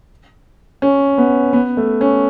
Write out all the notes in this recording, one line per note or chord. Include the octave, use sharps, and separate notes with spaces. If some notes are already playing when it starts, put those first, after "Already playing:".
C#4
B3
B3
A3
C#4